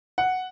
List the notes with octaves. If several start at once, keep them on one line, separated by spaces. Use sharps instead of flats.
F#5